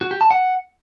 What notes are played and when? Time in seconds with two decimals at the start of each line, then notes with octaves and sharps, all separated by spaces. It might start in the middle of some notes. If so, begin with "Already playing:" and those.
0.01 F#4
0.11 G4
0.21 A5
0.31 F#5